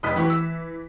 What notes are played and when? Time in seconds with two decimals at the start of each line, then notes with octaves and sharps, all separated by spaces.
0.03 F1 D#5 A5 F#6 B6
0.16 E3 F#4 G4
0.30 E6